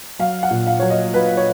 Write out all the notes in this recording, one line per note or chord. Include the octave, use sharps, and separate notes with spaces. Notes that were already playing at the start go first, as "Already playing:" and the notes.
F#3 F5
F#5
A#2
F5
F#3 C#5
D#5
F#3 B4
C#5